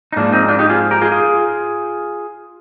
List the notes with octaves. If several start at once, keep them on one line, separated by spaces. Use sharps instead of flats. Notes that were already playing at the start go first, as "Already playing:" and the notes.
D#4
G#2 F3 A#3 D4
C4 D#4
D4 F4
D#4 G4
F4 G#4
G4 A#4
F4 G#4
F4 G#4